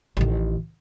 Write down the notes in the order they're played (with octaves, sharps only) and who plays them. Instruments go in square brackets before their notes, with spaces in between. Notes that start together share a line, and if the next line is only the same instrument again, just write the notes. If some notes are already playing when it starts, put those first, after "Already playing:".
[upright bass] A1 D#3